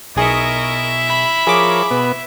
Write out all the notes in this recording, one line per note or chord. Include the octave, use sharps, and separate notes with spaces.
B1 E4 G#4 A#4 D#5 E5 C#6
B5
F3 G#4 A#4 C#5 D6
B2 B3